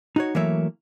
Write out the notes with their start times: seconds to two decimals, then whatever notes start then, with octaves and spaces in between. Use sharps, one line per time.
0.16 D#4 F#4 C#5
0.35 E3 F#3 A3 A#3 C#5 E5